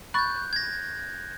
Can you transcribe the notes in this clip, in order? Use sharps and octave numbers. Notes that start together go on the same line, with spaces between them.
B5 C#6 F#6 G6 A6
G#6 A#6